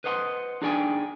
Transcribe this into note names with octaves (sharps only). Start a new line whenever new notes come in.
B4 C5 D#5 F#5 A#5 C6
D4 D#4 G#4 D5 G5 G#5